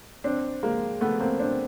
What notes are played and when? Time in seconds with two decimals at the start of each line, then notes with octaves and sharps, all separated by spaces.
0.24 C4 D4
0.63 G#3 A#3
1.01 A3 B3
1.20 A#3 C4
1.39 C4 D4